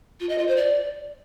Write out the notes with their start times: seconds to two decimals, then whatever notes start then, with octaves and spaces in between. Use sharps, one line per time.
0.20 F4
0.29 D#5
0.38 F4
0.47 C5
0.56 D5